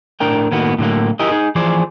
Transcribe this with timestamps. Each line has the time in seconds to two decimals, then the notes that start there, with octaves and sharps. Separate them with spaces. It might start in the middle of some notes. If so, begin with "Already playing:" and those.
0.20 A2 D4 A#4 G5
0.51 A2 D#3 A#3 B3 F#4
0.79 A2 D3 F#3 A#3
1.19 E4 G4 G#4 A#4 D#5
1.31 D#4 G#4
1.55 E3 F3 G#4 C5 D5